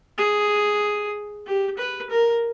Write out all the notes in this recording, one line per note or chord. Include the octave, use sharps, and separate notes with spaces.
G#4
G4
B4
A#4